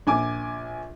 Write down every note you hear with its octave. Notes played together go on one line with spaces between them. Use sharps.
A#1 G#5 D6